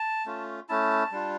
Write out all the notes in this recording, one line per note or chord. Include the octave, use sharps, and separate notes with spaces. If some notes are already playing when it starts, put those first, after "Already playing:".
Already playing: A5
A3 C#4 F4
A3 C#4 E4 A5
G3 D4 F4